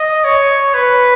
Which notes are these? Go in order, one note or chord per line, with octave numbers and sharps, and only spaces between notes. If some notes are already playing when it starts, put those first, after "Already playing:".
Already playing: D#5
C#5
B4